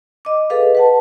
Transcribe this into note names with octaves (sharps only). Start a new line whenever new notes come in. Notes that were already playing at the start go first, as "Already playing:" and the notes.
D#5 D6
G#4 A4 B4 D#5 F5
B4 F#5 A5